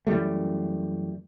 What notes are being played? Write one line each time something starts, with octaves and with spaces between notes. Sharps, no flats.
F#2 E3 G3 A3